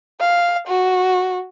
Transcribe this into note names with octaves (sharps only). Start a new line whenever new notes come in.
F5
F#4